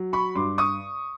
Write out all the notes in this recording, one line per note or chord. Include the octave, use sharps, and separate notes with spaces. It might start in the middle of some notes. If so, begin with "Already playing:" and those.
Already playing: F#3
B5 C#6
G2 C6 D6
C#6 D#6